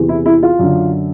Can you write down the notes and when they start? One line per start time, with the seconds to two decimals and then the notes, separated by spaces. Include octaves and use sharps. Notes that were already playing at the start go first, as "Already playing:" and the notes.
Already playing: E2 C3 E3
0.09 E4
0.26 E4
0.43 F4
0.59 F#2 D3